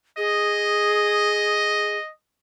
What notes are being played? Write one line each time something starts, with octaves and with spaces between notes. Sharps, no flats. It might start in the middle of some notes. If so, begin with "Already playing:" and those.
G#4 D#5